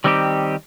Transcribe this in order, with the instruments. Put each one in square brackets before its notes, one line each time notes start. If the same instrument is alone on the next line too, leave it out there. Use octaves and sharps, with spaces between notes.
[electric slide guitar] D#3 G3 C4 D#4 G4